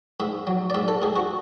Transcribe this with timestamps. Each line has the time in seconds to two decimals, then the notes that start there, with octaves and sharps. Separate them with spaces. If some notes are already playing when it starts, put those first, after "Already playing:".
0.20 G#2 E5
0.47 F#3
0.70 D5
0.74 G#2 E5
0.88 A4
1.02 G#2 G#4
1.16 F#4